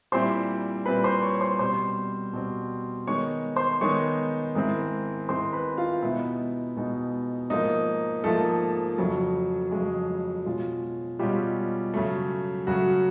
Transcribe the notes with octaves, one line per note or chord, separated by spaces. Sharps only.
A#2 G3 C4 E4 C5 C6
A#2 G3 C4 E4 B4 B5
C5 C6
C#5 C#6
C5 C6
B2 G3 C4 C5 C6
B2 G3 C4
D#3 G#3 B3 D#4 C#5 C#6
C5 C6
D#3 G#3 B3 D#4 C#5 C#6
G#2 D#3 G#3 C4 E4
G#2 D#3 G#3 C4 E4 C5 C6
B4 B5
F4 F5
B2 G#3 B3 D#4 E4 E5
B2 G#3 B3 D#4
G#2 F3 A#3 D#4 D#5
G#2 F3 A3 A#3 A4
F2 C#3 F#3 A3
F2 C#3 F#3 G#3 A3 G#4
B2 G#3 C#4 F4
B2 G3 G#3 C#4 F4 G4
F#2 C#3 F#3 A3
F#2 C#3 F#3 A3 F#4